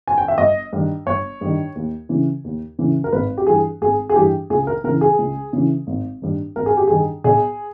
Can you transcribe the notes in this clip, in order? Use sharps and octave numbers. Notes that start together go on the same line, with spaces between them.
G#5
G5
E5
G1 D#5
G2 D#3
G1 C#5
G2 D#3
D#2
C#3 E3
D#2
C#3 E3
A#4
G#1 B4
G4
G2 E3 G#4
G#1 G#4
G#4
G2 E3 G4
C#2 G#4
A#4
C#3 E3 A#4
G#4
C#2
C#3 E3
G#1
G2 D#3
G#1 A#4
G#4
G4
G2 D#3 G#4
B1 G#4